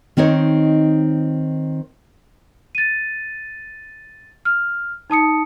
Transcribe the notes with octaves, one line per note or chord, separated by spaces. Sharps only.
D#3 C4 D#4 C#5
A6 D#7
F6
D#4 A5 D#6 C#7